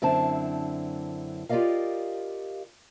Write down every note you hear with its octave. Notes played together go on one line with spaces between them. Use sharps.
F#2 D3 C4 E4 A5
F4 G4 A#4 D5 D#5 F5